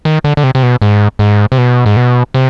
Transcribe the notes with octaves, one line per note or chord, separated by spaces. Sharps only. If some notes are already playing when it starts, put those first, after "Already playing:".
D#3
D3
D3
C3
C3
B2
G#2
G#2
C3
B2
G#2
B2
C3